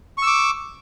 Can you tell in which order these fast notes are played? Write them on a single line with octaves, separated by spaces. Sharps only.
C#6 E6 D6